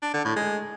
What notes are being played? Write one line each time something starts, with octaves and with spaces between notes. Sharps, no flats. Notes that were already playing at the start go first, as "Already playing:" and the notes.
D4
D3
A2
G#3